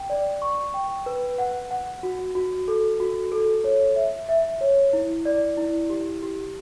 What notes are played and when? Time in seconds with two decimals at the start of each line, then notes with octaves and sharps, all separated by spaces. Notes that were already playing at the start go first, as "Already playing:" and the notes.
Already playing: G5
0.10 D5
0.42 C#6
0.74 G5
1.06 B4
1.38 F#5
1.71 F#5
2.03 F#4
2.35 F#4
2.68 A4
3.00 F#4
3.32 A4
3.64 C#5
3.96 E5
4.29 E5
4.61 C#5
4.93 E4
5.25 D5
5.57 E4
5.90 G4
6.22 G4